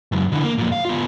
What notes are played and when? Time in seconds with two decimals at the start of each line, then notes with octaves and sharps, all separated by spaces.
0.12 C#2 F#2
0.32 D3 E3
0.43 A#3
0.58 F2 A#2
0.72 F5
0.85 B3 F4